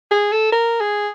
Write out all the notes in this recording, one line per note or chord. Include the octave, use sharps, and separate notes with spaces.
G#4
A4
A#4
G#4